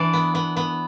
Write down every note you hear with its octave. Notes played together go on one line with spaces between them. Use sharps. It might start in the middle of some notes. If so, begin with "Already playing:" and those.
Already playing: E3 D4 D5
B3
B3
B3